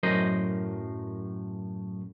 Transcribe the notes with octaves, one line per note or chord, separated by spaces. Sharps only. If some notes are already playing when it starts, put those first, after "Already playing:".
F#2 A2 F#3 A#4 C5 D#5